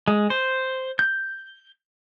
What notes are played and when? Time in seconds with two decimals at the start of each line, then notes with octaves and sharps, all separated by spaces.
0.08 G#3
0.30 C5
0.99 G6